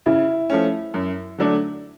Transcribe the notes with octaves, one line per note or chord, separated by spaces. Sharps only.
C#3 E4
F3 A3 C#4
F#2
D3 F#3 A3 D4